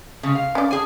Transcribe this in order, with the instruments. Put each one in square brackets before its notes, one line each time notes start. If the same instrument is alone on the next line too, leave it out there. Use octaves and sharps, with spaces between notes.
[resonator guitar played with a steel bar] C#3 G#3
F5
[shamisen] C#4 D5
[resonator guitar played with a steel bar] G#4 G#5